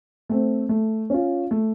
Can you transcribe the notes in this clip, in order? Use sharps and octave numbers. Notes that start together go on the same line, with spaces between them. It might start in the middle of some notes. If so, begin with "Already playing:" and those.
A3 C4
A3
C#4 F4
A3